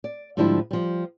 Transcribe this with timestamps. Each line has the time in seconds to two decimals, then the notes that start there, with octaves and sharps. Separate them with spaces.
0.04 D5
0.37 G#2 D3 F3 G3 D4 E4
0.71 F3 G3